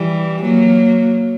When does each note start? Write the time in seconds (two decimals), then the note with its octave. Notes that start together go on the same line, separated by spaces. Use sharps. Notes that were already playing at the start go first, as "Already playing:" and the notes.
Already playing: E3 G3
0.41 F#3 A#3